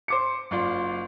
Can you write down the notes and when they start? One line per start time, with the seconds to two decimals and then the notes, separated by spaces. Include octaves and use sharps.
0.08 C5 D6 C#7
0.51 F#1 F4 D5 C6